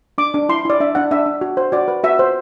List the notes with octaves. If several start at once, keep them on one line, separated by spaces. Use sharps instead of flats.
D4 D6
D4
E4 C6
E4 D5
D4 E5
D4 F#5
D4 E5
D4
F#4
C5
F#4 D5
B4
F#4 E5
C5